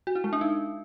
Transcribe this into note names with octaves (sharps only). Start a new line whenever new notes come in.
F#4
E4
G#3
D4
D#4